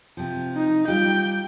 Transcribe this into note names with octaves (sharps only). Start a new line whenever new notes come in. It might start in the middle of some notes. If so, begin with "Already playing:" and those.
C3 F3
D#4
G3 F4 G4 G5